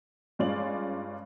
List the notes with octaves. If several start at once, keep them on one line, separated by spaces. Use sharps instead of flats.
G2 G#3 C#4 F4 D5 F#7